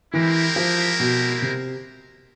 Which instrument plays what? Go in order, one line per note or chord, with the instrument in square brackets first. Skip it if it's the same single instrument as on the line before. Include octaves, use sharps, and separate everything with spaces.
[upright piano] E3 [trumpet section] G#3 C4 E4 G4 A#4
[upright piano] F3
B2
C3